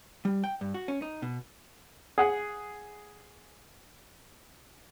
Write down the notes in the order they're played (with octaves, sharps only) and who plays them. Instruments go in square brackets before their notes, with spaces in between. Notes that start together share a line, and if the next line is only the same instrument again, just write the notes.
[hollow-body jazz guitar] G3
G5
G2
F#4
C#4
D#4
B2
[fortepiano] G#4 F#5